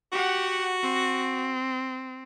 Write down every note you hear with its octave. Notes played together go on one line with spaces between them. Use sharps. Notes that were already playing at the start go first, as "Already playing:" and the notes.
F#4 G4 F#5
C4